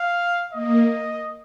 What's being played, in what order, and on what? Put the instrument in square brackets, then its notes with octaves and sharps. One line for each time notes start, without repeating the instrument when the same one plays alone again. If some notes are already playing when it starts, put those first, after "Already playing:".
Already playing: [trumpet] F5
[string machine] A#3 [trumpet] D#5